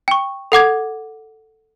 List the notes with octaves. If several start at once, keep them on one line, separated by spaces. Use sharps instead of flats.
G5 C#6
A4 F#5 D6 G#6